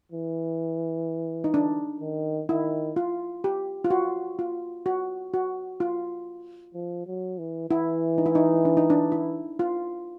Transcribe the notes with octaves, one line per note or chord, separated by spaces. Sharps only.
E3
D#4
D4
D#3
D#3 E4
F4
G4
F4
F#4
F4
F#4
F#4
F4
F3
F#3
E3
E3 E4
D#4
E4
D#4
D4
D#4
D4
E4
F4